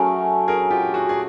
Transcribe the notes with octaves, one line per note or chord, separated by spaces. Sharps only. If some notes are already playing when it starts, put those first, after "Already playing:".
Already playing: F#3 A3 C#4 G#4 A#4
G#4 A#4
F4 G4
F#4 G#4
G#4